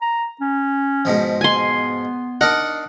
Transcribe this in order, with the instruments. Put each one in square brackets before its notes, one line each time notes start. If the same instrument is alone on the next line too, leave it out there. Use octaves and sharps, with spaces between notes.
[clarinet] A#5
C#4
[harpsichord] G#2 B2 F3
[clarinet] B3 [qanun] G#5 C6
[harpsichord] D4 D#4 A#4 [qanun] F#5